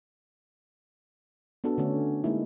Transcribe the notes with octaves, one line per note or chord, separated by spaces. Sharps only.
B3 D4 F#4 A4
D3 A3 C#4
G#3 A#3 D#4 E4